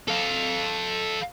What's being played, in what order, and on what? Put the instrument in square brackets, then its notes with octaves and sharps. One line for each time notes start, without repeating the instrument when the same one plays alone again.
[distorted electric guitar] A4 F5